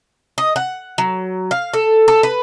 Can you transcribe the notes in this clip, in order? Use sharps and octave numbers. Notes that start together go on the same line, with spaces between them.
D#5
F#5
F#3
F5
A4
A4
B4